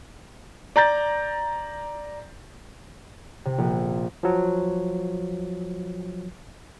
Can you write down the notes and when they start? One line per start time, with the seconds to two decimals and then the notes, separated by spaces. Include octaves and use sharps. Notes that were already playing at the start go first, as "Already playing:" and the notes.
0.76 D5 A#5 G6 A6
3.45 C3
3.58 A#1
4.23 F3 F#3